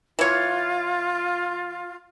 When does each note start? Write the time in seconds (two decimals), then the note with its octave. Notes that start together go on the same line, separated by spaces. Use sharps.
0.19 E3 F4 C#5